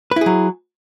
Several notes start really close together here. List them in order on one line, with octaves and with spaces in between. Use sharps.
B4 E4 G#4 F#3